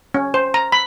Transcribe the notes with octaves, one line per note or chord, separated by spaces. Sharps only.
C#4
C5
A#5
B5